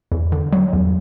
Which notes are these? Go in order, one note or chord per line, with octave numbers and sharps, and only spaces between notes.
E2
D3
F#3
E2